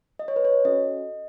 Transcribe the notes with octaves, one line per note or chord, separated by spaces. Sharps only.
D#5
C#5
B4
C#5
C#4 F#4 A4 D#5